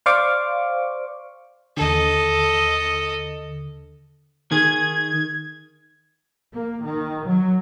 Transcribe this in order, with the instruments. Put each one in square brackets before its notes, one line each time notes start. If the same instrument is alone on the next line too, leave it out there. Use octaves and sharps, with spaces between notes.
[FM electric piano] C5 D5 F5 C#6 D6
[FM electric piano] D#2 D3 [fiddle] A4 D#5
[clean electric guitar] D#3 G#4 [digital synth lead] G#6
[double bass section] A#3
D#3
F#3